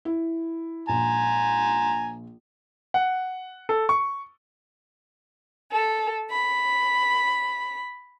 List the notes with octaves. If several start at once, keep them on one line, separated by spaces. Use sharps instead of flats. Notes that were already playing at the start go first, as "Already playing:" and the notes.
E4
A#1 G#5 A#5
F#5
A4
C#6
A4
B5